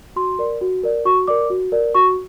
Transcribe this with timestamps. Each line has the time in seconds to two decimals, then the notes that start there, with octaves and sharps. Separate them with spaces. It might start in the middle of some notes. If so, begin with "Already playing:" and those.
0.16 F#4 C6
0.39 A#4 D5
0.61 F#4
0.83 A#4 D5
1.05 F#4 C#6
1.28 A#4 D5 D6
1.50 F#4
1.72 A#4 D5
1.95 F#4 C#6